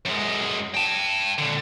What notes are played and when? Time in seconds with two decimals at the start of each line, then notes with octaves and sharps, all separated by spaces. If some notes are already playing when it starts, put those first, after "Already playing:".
0.06 F#2 G#3
0.75 G5 A5
1.38 A#2 D3